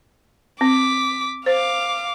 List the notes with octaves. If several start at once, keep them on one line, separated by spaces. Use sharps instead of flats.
C4 D6 B6
C5 F5 D6